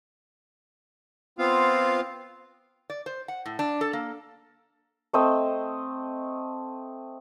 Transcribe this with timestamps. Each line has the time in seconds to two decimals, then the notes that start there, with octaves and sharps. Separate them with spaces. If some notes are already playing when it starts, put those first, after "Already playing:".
1.39 B3 C4 F4 F5
2.90 D5
3.06 C5
3.28 F#5
3.46 A2
3.59 D4
3.81 A4
3.93 A#3
5.13 A3 C4 D#5 E6